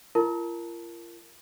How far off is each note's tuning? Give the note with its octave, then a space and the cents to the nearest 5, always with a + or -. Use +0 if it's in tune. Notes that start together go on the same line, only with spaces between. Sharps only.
F4 -35 A#4 +0 A5 +0